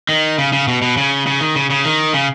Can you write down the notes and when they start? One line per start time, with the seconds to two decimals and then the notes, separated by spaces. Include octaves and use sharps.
0.09 D#3
0.38 C#3
0.53 C#3
0.68 B2
0.82 B2
0.97 C#3
1.27 C#3
1.41 D#3
1.56 C#3
1.70 C#3
1.85 D#3
2.14 C#3